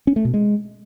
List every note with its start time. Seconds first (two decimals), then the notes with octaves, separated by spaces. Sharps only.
0.07 C#4
0.16 A3
0.25 B2
0.34 G#3